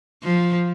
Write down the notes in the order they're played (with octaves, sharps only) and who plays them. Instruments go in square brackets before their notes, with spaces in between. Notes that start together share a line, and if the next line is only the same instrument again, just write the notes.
[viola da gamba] F3